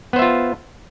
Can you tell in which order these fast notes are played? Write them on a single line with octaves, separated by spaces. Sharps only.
B3 C5 E5 F4